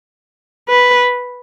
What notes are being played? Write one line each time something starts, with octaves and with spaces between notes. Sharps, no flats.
B4